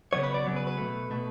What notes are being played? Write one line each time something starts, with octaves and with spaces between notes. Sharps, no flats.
C#3 F#3 B3 C#5
B4
D5
C#3 F#3 B3
B4
B4
B2 A3
B2 A3